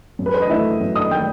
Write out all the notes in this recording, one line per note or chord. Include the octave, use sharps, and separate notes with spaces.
F#2
B4
C5
D#5
D#3 A3 D#4 E4 E5
F#2
D#5 D#6
D#3 A3 D#4 G5 G6